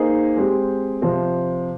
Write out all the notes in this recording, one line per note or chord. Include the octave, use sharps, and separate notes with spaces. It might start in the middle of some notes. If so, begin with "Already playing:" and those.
Already playing: A#3 D#4 G#4 C5 D#5
G#3 C4 G4
C3 F3 C4